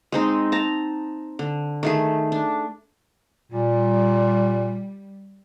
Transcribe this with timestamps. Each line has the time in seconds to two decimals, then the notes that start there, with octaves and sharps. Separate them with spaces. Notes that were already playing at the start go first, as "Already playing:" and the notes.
0.12 G#3 C4 D#4
0.52 A5 A#5
1.39 D3
1.83 D#3 A3 G#4
2.32 D4
3.52 A#2 G3